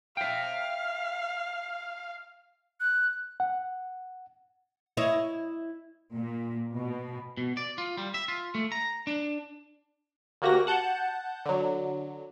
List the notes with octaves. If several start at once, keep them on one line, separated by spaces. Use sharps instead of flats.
E5 F5 G5
F#6
F#5
E4 C#5 D#5
A#2
B2
B2
D5
F4
G3
E5
F4
A3
A#5
D4
D2 A#3 F#4 G4 A#6
F#5 A5 G6
D3 F#3